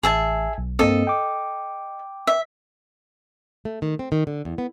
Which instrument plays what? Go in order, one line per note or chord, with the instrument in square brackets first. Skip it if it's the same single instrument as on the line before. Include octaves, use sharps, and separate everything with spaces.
[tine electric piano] A1 [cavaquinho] G#4 E5 A5
[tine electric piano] B1
[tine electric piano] G2 A#3 C4 [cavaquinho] A4 D#5
[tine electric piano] G5 D6
[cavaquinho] E5
[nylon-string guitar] A3
D#3
C4
D#3
D3
E2
B3